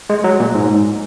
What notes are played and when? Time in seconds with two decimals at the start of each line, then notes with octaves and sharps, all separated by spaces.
0.10 G#3
0.24 F#3
0.40 A#2
0.55 G#2